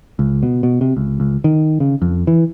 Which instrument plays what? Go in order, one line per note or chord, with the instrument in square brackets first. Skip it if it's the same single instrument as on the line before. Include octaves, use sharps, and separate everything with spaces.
[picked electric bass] C#2
B2
B2
C3
C#2
C#2
D#3
C#3
F2
E3